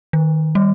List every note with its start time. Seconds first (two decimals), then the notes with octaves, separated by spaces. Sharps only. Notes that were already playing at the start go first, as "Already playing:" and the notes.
0.13 D#3
0.55 G3